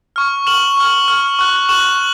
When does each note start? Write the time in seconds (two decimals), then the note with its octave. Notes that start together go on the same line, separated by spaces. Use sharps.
0.16 C#6 F6
0.47 C#6 F6 E7 F#7
0.77 C#6 F6
1.08 C#6 F6
1.39 C#6 F#6
1.69 C#6 F#6 E7 F#7